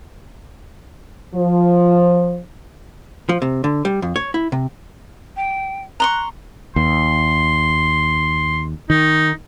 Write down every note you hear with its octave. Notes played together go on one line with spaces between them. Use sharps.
F3
F3
C3
D3
G3
F2
C#5
E4
C3
G5
A#5 C6 C#6 F#6
D#2 C6
D#3 D#4